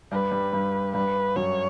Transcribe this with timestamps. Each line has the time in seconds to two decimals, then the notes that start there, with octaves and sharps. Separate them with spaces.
0.12 G2 G3 B4
0.32 G2 G3
0.53 G2 G3
0.94 G2 G3 B4
1.36 F#2 F#3 C#5